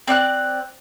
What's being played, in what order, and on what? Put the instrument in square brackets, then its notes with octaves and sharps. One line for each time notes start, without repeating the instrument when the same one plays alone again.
[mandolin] C4 D5 F#5 F#6